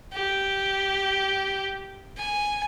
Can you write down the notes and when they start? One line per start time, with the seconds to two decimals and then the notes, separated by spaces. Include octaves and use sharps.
0.13 G4
2.17 G#5